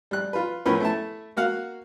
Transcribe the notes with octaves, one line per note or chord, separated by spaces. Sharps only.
G3 F#6
F4 B4
A2 F3 B3 C#4 A#4 B4
A3 E4 A5
A#3 F#4 F5 F#5